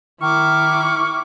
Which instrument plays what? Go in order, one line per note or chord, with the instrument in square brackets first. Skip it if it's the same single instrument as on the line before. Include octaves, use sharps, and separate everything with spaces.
[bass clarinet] D#3 [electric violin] E4 D6 [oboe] C#6 [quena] F6